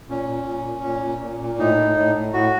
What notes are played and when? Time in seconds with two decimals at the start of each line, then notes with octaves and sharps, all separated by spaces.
0.09 A#2 C#4
0.29 A#2
0.47 A#2
0.66 A#2
0.84 A#2
1.02 A#2
1.22 A#2
1.40 A#2
1.58 A2 D#4
1.77 A2
1.96 A2
2.15 A2
2.33 A2 F#4